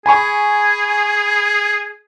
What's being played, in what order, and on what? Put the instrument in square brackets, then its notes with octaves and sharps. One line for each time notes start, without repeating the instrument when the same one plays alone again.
[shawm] G#4 [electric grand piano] G#5 B5 C#6